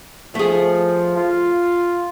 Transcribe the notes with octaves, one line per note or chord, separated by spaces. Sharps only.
F3 A3 G#4
F4